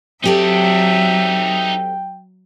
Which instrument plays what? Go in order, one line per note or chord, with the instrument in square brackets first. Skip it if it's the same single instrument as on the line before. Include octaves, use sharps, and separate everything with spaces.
[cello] F#3 E5 [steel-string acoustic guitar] C4 G4 A4 [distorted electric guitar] D#4 D5 [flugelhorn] G5